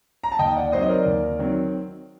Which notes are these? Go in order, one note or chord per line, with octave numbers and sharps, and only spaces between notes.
A#5
A5
D#2 D#5 G5
D5 F#5
D#3 F#3 C4 C5 D#5
D#5
A#4 D5
D#2
D#3 F#3 C4